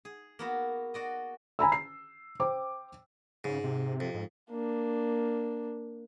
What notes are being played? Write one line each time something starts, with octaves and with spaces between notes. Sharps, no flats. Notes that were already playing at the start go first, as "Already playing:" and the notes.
G#4
A#3 B3 F#4
F#4 D5 D#5
G#5 A#5 B5 E6
C7
C5 G5 D6
G#2 C#3
C3
F2
G#2
A#3 D4